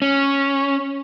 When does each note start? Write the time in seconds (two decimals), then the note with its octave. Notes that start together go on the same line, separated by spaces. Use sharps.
0.02 C#4